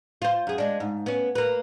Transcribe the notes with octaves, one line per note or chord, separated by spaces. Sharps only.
F4 C5
F#2 G#4
G#3 D4
G#2
B3 C#4
A#3 B4